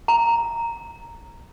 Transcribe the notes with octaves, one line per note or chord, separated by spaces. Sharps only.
A#5